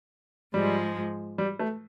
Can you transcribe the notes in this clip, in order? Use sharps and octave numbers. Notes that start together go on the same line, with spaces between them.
G#2 F3 G3 G#3
G3
A3